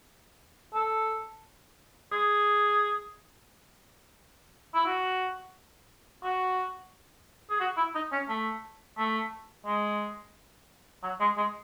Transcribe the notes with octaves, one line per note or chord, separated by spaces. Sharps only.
A4
G#4
E4
F#4
F#4
G#4
F#4
E4
D#4
C#4
A3
A3
G#3
F#3
G#3
G#3